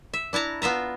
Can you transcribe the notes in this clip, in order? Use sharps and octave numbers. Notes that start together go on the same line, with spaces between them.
E5
D4 E4 A5 A#5
B3 F4 E5 A#5